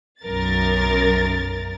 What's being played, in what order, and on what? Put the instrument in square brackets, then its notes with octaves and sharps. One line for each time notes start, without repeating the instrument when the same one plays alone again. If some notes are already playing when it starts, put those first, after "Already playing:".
[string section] B1 F#2 A#4 A6